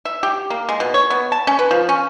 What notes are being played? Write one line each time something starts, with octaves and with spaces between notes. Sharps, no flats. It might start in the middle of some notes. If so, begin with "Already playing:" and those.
E5
G4
A#3
G#3
B2
C#5
B3
A5
C#4
B4
F3
C#4